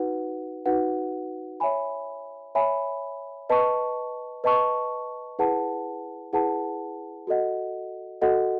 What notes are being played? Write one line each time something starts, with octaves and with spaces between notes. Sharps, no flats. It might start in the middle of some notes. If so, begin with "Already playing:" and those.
Already playing: D#4 F#4 B4 F#5
D#4 F#4 B4 F#5
C#5 E5 G#5 B5
C#5 E5 G#5 B5
B4 D#5 A5 C#6
B4 D#5 A5 C#6
E4 G#4 B4 F#5 A5
E4 G#4 B4 F#5 A5
F#4 A4 D#5 F#5
F#4 A4 D#5 F#5